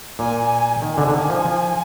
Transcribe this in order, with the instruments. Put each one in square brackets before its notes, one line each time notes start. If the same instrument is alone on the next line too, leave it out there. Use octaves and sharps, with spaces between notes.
[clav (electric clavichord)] A#2 [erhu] G#5
[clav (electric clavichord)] D#3 [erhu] G#5
[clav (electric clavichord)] D3
D3
D#3
F3
F3